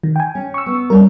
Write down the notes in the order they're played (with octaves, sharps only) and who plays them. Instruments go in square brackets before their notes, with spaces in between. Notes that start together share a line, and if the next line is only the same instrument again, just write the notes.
[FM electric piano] D#3
G5 G#5
[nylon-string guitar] C#4
[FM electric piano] C#6 E6
[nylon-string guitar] B3
[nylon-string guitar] G3 A#3 D4 [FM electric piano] C#4 A#4